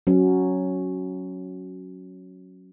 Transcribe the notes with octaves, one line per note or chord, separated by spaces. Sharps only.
F#3 C#4